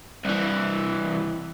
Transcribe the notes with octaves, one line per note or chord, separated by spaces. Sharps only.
C2 E3